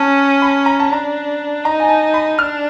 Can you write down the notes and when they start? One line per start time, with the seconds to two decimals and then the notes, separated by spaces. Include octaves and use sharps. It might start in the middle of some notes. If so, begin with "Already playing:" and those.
Already playing: C#4 A5
0.42 B5
0.66 A#5
0.80 A5
0.91 D4 A#5
1.64 D#4 A#5
1.80 G#5
1.89 A5
2.14 B5
2.38 D4 F6